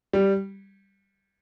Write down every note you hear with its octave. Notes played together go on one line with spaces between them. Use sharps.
G3